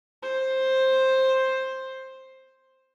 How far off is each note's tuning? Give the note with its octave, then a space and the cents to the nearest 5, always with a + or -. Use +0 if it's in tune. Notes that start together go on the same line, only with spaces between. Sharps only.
C5 +10